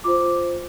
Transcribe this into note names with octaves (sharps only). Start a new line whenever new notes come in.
F4 C5 D6